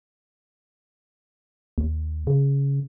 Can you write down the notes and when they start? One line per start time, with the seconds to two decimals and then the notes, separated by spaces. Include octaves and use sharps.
1.78 D#2
2.27 C#3